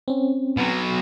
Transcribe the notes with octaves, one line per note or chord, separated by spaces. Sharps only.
C4 C#4
B2 F#3